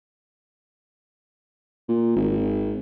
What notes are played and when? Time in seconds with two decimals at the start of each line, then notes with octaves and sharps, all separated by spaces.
1.89 A#2
2.16 G#1